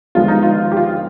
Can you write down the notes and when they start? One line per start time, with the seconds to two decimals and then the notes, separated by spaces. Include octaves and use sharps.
0.15 D#2 D3 F3 G#3 B3 F4
0.28 D#4
0.43 F4
0.72 G4
0.77 F4